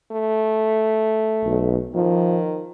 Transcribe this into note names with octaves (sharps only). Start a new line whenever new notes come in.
A3
B1
D#3 F3